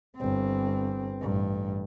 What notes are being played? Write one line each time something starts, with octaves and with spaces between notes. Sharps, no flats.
G1 C4
A1 G2